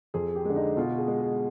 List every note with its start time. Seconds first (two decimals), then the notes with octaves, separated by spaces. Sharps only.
0.14 F2 G#4
0.35 G4
0.45 D3 G#3
0.56 D#4
0.77 B2 F4
0.98 G#4
1.08 G#3
1.18 G#4